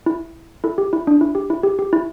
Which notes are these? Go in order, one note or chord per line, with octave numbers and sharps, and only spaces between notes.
E4
E4 A4
G4
E4
D4
E4
G4
E4
G4
G4
E4